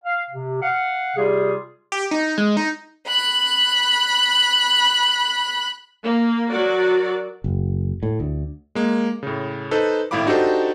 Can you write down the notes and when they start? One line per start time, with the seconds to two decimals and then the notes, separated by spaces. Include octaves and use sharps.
0.05 F5
0.31 C3
0.62 F5 F#5
1.17 C3 G3 F4 G4 G#4
1.92 G4
2.11 D#4
2.38 G#3
2.57 D#4
3.07 B5 F#6
6.02 A#3
6.49 F#3 F#4 A#4 D5
7.44 F#1
8.03 A2
8.20 D2
8.75 G#3 A#3
9.23 A2 C#3
9.71 D#4 A4 B4 C5
10.11 G#1 A2 E4 F5 B5 D6
10.26 D4 D#4 F#4 G4 A4 C5